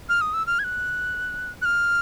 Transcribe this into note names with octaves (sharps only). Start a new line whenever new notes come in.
F6
D#6
E6
F6
G#6
F#6
F#6
F6